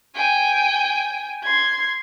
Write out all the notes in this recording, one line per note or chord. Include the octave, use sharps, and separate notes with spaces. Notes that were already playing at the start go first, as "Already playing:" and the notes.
G5 G#5
C6 G#6